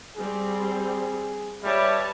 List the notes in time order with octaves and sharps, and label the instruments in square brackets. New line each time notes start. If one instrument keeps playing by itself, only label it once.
[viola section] G3 C4 [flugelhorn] G#4
[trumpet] G3 [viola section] B4 C#5 A5 [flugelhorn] E5